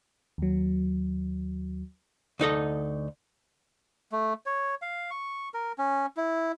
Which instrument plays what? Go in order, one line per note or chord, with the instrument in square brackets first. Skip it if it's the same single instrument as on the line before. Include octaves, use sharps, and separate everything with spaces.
[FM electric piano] D#2 F#3
[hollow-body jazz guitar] D2 D#4 A4 D#5
[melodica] A3
C#5
F5
C#6
A#4
C#4
E4